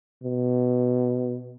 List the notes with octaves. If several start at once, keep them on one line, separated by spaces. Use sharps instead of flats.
B2